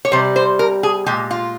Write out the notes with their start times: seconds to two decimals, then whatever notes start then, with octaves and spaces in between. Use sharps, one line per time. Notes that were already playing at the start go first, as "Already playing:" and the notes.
0.05 C#5
0.12 C3 G3 C5
0.36 C5
0.59 A#4
0.83 G#4
1.06 A#2 G#3 G4
1.31 F4